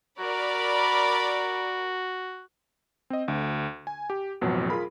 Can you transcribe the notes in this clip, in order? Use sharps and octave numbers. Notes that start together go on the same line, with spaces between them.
F#4 A#4 D5 B5
C4 D#5
D2
G#5
G4
A1 F2 B2 F#3
F4 G#4 A#4 B5